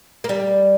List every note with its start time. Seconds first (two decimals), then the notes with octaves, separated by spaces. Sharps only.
0.24 A#3
0.29 G3